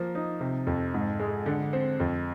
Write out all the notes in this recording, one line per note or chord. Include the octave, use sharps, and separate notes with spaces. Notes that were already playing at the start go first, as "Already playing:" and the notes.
Already playing: F3 A#3
D#4
C3
F2
G#2
G#3
D3
C4
F2